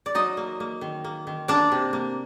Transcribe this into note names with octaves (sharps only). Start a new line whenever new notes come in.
D5
F#3 D#4 D#5
A#3
A#3
D#3
A#3
D#3
A#3 D4 D5
C3
A#3